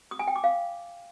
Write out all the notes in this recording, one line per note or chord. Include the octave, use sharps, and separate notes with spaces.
D#6
G#5
G5
D6
F5